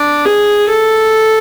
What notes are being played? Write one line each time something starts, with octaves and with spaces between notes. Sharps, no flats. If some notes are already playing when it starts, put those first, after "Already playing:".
Already playing: D4
G#4
A4